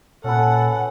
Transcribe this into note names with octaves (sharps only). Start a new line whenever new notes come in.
A#2 C#4 A4 B4 F#5